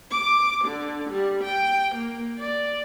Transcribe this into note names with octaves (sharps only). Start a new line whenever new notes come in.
D6
D3
G3
G5
A#3
D5